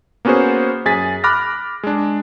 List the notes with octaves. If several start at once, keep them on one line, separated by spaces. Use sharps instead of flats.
A#3 B3 C#4 F#4 G#4 C5
F#2 G#4 G#5 A6 B6
B5 D6 F6 F#6 A#6
G#3 D4